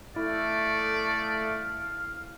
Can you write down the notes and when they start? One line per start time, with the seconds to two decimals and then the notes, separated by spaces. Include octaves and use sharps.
0.16 A3 E4 D5 F5